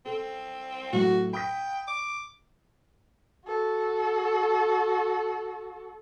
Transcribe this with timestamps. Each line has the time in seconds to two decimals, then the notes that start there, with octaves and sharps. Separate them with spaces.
0.06 C4 A4
0.93 A2 F#3 F#4
1.33 G5 B5 D#6 B6
1.88 D6
3.46 F#4 A4